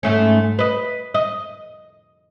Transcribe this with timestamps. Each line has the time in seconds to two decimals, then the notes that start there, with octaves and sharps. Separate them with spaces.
0.03 G#2 A3 C#4
0.59 B4 D#5
1.14 D#5